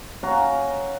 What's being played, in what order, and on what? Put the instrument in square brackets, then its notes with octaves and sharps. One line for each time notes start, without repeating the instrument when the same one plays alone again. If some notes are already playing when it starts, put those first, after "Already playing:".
[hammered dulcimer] C#4 F#4 F5 A#5